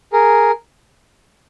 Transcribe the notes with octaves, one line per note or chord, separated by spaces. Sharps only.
G#4 A#4